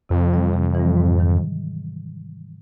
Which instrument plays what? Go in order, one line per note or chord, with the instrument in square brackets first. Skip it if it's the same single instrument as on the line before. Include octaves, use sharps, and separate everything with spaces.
[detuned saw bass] F2 [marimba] C3
[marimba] E3 G3
C3
E3 G3
G#2
D#3 F#3